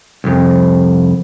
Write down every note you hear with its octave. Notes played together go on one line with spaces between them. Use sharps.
C2 F2